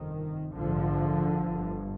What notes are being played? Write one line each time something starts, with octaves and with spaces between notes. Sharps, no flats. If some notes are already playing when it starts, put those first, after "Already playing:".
Already playing: G1 F2 C3 D#3
A#1 G#2 D3 F3
G1 G2